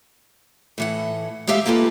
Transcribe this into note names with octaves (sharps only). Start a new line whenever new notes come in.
A2 E3 F#5
G#3 A3 G4 E5 F5
A#3 F4 G4 A4 B4